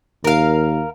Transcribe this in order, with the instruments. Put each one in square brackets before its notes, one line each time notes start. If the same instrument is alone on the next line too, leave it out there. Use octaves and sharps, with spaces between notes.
[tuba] D#2 [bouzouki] A#4 F5